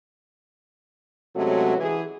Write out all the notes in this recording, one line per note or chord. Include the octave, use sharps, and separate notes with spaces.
C3 F#3 G#3 A3 C#4 F#4
E3 G#4